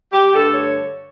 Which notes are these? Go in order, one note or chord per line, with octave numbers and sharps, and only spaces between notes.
G4
G2 D3 A3 A4
C#5